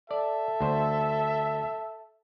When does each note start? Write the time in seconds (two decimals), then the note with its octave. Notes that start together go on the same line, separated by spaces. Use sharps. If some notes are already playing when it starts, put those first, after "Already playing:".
0.11 A4 D5 E5
0.61 D2 C5